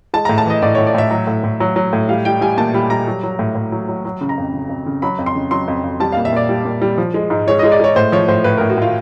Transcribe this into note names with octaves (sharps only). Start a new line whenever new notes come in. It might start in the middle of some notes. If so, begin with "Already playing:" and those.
G#3 A5
A2 A#5
A5
E3 D#5
A2 D5
A2 C#5
D5
A2 E5
F#3
A2
A2
F#3
F#3
A2
G3 F5
G3 G5
G3 G#5
A#2 A5
G3 B5
G3 A#5
F#3
F#3
A2
A2
F#3
F#3
F#3
C#3
A#5
F2
C#3
F2
C#3
F#3 B5
F2
C6
C#3
F#3 C6
F2
F2
G3 A5
A#2 F5
E5
A#2 D5
G3
A#2
G3
F3
G#3
G#2
G#3 C#5
G#3 D#5
D5
G#3 C#5
A2 C5
F3 C#5
A2 C5
A2 B4
A2 A#4
F#4
A2 F4